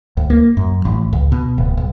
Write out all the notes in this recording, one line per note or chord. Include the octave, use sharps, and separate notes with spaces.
D2
A#3
F#2
A1
C#2
B2
D1
B1